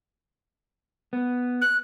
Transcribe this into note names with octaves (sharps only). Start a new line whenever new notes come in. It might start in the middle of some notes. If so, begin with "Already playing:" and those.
B3
F#6